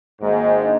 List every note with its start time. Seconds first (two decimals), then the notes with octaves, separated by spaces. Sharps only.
0.21 G#1 G#2 A#3
0.63 D4